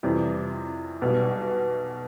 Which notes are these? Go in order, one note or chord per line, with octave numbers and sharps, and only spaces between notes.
F2 C3 E3 G3
B1 B2 G3